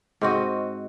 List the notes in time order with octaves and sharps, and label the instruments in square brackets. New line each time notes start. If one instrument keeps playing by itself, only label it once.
[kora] G#2 C4 F#4 D#5